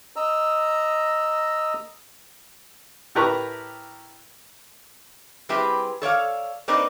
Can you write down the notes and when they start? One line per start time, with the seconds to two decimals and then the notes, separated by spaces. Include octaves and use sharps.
0.16 D#5 A#5 E6
3.15 A2 G4 A#4 B4 A#5 C#6
5.49 G3 C4 E4 G4 G#4 B4
6.02 A4 C#5 D5 F5
6.68 A#3 C4 D#4 B4 D5